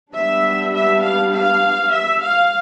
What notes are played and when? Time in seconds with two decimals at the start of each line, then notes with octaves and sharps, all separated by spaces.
0.14 G3 B3 D4 E5
0.74 E5
1.02 F5
1.32 F5
1.92 E5
2.22 F5